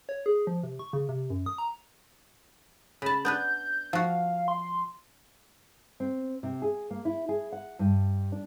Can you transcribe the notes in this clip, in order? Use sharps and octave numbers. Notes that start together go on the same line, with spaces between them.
C#5
G#4
F3
C3
C#6
C#3
C3
F#2
D#6
A#5
C#3 A5 B5
B3 D4 B4 G6
F3 F#4 F5
C6
C4
C3
G#4
A#3
E4
G#4
F#5
G2
D4